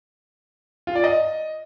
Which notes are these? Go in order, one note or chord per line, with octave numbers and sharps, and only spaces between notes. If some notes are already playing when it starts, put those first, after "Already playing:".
F4
D5
D#5